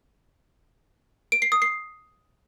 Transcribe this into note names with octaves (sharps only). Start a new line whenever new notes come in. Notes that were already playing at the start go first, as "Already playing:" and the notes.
D7
C7
D#6
C7